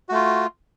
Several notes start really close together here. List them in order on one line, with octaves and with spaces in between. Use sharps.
F#4 A3 F4